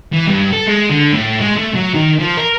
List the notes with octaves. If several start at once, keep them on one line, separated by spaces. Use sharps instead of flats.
E3
G2
A4
G#3
D3
A2
G#3
A3
F#3
D#3
F3
A#4